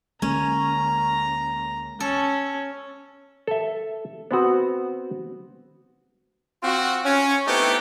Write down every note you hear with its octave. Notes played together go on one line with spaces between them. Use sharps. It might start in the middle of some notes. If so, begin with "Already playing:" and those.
D2 G#3 A#3 C#4 A#5
C#4 A4
A4 E5
B3 C4 F#4
C4 F4 F#4
C#4
A3 B3 C4 D#4 E4 G4